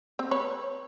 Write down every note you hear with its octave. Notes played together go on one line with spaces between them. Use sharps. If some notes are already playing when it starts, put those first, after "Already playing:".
C4
B4 C#5